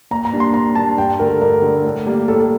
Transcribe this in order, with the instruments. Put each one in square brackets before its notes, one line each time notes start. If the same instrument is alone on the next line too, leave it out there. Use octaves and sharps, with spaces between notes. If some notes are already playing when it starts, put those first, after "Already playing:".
[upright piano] A#2 [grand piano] A#5
[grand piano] A#5
[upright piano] G3 A#3 D4
[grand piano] C6
[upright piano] A#2 [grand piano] A#5
[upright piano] G3 A#3 D4 [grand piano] A5
[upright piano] G2 [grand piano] G5
[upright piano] D3 A3 [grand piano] A#4
[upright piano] G2 [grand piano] A#4
[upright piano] D3 A3
A2
G3 A#3
[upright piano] A2 [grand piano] A4